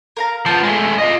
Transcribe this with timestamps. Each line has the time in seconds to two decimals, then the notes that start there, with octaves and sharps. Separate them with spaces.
0.17 A#4 F5 A#5
0.46 F3 B3 A5
0.63 G#3 A3
0.98 F4 D#5